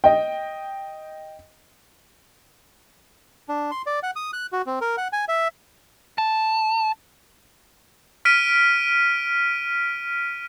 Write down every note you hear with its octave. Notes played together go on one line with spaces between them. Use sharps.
D#5 G5
D4
C6
D5
F#5
D#6
F#6
F#4
C4
A#4
F#5
G#5
E5
A5
F6 B6 D7 D#7